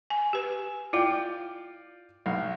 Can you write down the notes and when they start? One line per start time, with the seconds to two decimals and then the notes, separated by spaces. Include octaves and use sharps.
0.10 G#5
0.33 G4 B4
0.93 E4 F4 D5 F5 G5
2.26 B1 F5